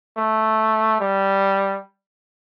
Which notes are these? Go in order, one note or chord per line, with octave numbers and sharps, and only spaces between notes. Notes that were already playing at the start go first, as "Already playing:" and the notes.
A3
G3